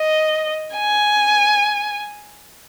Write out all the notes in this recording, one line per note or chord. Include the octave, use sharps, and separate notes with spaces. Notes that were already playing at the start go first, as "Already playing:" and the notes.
Already playing: D#5
G#5